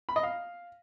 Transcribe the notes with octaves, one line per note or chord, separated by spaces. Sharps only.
B5
D#5
F5